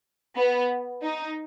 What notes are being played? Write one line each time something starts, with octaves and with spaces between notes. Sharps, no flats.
B3
D#4